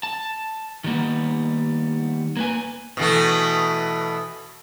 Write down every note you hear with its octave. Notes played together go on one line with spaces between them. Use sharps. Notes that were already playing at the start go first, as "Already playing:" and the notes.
A5
D#3 G3 A#3 B3
A#3 B4 G#5
B2 E3 A3